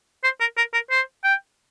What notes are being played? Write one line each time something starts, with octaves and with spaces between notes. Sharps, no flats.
C5
A#4
A#4
A#4
C5
G5